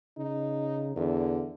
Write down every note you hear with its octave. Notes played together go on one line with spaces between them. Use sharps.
C#3 D#4
E2 D3